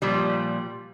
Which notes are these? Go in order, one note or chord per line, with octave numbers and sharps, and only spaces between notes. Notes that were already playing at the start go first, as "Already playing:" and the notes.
A#2 F3 G3